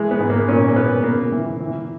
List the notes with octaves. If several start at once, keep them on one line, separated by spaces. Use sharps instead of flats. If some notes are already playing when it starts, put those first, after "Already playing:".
Already playing: E3 G#3
B3
G#2
A#3
A#2 C#4
A#3
A#2 B3
C#3 A#3
E3
E3